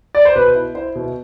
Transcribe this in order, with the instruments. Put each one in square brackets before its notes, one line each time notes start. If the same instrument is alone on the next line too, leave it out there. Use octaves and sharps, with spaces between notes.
[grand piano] D5
C5
B2 B4
E4
E4 C5
B2